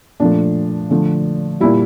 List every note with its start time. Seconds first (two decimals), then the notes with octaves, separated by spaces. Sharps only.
0.20 A#2 F3 A3 D4
0.90 D3 F3 A3
1.60 A#2 G3 E4